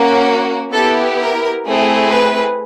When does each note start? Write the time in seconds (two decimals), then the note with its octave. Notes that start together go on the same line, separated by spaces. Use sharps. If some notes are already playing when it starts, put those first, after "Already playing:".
Already playing: A#3 C#4 F#4
0.72 B3 E4 G4 A4
1.19 A#4
1.65 A3 C4 E4 G#4
2.12 B4